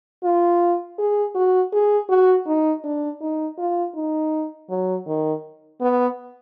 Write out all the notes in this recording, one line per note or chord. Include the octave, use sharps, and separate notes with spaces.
F4
G#4
F#4
G#4
F#4
D#4
D4
D#4
F4
D#4
F#3
D#3
B3